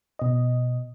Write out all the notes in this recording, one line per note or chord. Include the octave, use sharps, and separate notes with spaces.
B2 D#5